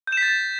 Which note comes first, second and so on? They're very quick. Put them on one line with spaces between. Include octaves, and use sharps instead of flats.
G6 E7 B6 A6